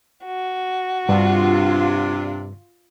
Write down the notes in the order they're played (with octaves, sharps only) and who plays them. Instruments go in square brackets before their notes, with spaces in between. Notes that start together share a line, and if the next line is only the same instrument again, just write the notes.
[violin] F#4
[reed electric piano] G2 [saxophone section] C3 D4 [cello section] F4